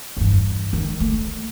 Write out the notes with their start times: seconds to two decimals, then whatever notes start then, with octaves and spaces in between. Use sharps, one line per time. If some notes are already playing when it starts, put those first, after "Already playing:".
0.17 E2 G2
0.73 D#3
1.00 A3